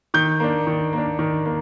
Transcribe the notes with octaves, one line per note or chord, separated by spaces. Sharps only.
D#3 G6
A#3 D4
D#3
A#3
D4
D#3
A#3